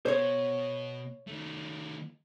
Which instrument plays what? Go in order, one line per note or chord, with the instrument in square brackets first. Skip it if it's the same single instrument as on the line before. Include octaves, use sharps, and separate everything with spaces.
[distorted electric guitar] B2 [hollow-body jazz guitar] C5 C#5
[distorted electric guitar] D#3 A3